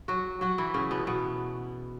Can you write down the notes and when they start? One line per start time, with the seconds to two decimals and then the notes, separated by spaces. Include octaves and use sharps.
0.08 F#3 F#4
0.41 F#3 F#4
0.58 E3 E4
0.74 C#3 C#4
0.91 B2 B3
1.07 B2 B3